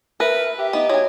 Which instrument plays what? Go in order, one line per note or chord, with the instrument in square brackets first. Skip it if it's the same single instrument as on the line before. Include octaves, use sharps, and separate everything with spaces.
[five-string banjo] A#4 [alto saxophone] B4 [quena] E5
[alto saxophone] G4
[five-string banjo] B3 [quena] D#4 [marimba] D#5
[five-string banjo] F#3 G#5